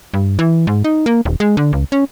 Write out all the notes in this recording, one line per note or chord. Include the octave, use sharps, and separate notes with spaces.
G2
E3
G#2
D#4
A#3
D#1
G#3
D3
C#2
C#4